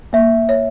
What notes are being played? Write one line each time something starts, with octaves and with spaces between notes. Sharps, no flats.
A#3 E5
C#5